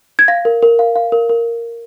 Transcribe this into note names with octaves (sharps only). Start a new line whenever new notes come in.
G#6
F5 A#6
A#4
A#4
F5
F5
A#4
A#4